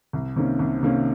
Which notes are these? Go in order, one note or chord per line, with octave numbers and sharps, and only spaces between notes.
C2
C3 D#3 A#3 C#4
C2
C3 D#3 A#3 C#4